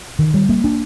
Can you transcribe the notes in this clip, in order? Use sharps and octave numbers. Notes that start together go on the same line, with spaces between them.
D#3
G3
A#3
D4